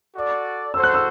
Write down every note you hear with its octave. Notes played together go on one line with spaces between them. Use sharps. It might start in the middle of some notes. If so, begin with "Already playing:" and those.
F#4 A4 D5
F#4 A4 C5 E6
F#6
E6